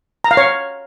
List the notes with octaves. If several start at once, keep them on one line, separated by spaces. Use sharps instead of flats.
A#5
F5
C#5